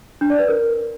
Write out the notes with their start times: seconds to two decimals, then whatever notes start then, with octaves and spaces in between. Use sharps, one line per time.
0.21 D4
0.30 D5
0.39 B4
0.48 A#4